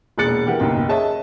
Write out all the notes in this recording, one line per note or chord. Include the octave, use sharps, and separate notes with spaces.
E1 A#2 G#4 F#6 A6 C#7
E3 G4 A#4 F#5
F#1 B1 A#3 D#4 G5
G#4 C#5 D#5 E5 A5